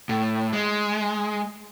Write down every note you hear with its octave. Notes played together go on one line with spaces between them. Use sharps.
A2
G#3